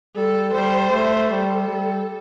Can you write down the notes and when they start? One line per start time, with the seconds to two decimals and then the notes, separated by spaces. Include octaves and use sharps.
0.15 G3 A4
0.54 G3 C5
0.92 A3
1.30 G3 A4
1.68 G3